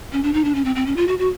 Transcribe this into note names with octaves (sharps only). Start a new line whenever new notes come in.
C#4
D4
D#4
D4
C#4
C4
C4
C#4
F4
F#4
F#4